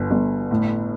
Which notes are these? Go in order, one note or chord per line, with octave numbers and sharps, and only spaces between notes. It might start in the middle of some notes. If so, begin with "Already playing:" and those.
Already playing: G1
G1
A2